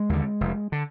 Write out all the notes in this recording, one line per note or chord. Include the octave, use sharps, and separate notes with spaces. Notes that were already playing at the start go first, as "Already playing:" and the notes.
Already playing: G#3
D#2 D3
F1
D3